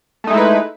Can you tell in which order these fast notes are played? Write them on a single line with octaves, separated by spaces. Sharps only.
A3 D#4 G#3 E4 B4